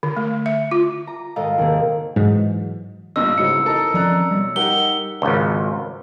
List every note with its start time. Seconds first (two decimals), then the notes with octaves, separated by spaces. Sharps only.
0.03 D3
0.17 A3
0.46 E5
0.71 F4
1.07 A#5
1.36 G#1 A4 A#4 D#5 F5 A#5
1.58 D#2 C3 A#3 G#4
2.16 G#2 E3 F#3 G#3
3.16 G1 G2 A#2 D#5 E6
3.38 A1 C#3 F#3 C4 D#4 C#7
3.66 A4 A#4 D#5
3.94 F3 C4 C#4 D5 A#5 F#6
4.31 B1 G3
4.56 D#4 G4 A#4 F#5 G7
5.22 G#1 C#2